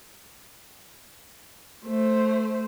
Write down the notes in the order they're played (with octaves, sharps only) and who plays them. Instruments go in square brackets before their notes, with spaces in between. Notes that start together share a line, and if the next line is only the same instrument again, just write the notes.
[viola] A3 C5